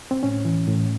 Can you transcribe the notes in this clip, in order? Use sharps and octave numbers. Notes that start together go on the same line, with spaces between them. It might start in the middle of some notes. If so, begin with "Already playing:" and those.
C4
A2 C#4
E3
A2